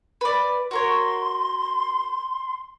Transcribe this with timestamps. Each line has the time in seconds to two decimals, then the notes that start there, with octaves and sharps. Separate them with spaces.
0.21 B4 D5
0.71 F#4 A#4 C#5 C6